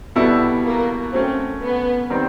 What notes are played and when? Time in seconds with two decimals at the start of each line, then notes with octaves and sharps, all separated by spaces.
0.16 B2 G3 B3 E4 A4
0.65 A#3
1.12 F#3 A3 C4 C#4
1.61 B3
2.10 D#3 G3 C4